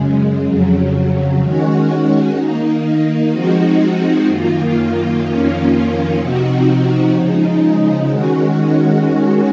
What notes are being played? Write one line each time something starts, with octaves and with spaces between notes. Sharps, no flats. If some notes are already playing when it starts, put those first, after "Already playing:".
Already playing: F#2 C#3 G#3
F2 C#3 F#3
D#3 G#3 C#4 F#4
D#3 A#3 D#4
F3 G#3 C4 D#4 F#4
F#2 D#3 A#3 F4
F2 D#3 A#3 C#4 F4
C3 F3 C4 D#4 F#4
C#3 F3 G#3 D#4
D#3 G#3 C#4 F#4